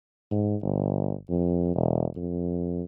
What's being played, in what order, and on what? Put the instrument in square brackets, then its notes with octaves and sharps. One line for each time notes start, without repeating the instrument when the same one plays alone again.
[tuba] G#2
G1
F2
E1
F2